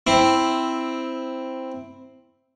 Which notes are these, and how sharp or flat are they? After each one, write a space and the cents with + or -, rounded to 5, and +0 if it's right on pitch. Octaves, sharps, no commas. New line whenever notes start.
C4 +0 E4 +0